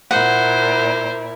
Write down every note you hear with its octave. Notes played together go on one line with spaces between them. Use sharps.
A#2 E4 A#4 C5 F#5